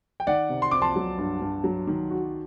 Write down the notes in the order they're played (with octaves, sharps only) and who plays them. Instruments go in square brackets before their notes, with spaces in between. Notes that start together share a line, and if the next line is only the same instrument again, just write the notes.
[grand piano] G5
[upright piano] D#3 [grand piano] D5 F#5
[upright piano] C3
[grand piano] C6
[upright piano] C4 [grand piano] D6
[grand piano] A5 C6
[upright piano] F#3
G2
G2
F#3
D#3
F#4